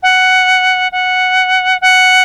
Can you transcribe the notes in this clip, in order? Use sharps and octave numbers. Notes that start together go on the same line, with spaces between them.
F#5
F#5
F#5